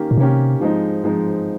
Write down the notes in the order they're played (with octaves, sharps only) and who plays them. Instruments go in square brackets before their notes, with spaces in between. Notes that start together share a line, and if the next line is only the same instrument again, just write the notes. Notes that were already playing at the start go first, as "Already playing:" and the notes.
Already playing: [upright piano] D#3 A#3 C#4 G4
[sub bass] A#2
[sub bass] C3 [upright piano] D#3 A#3 C#4 G4
[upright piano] G#2 F3 G#3 C4 D#4
G#2 F3 G#3 C4 D#4